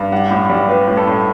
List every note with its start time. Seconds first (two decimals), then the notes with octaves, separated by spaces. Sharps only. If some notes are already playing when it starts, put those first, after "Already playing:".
Already playing: G2
0.12 G3 F#5
0.30 A2
0.49 G3
0.69 G3 B4
0.88 A2
0.97 A4
1.07 A2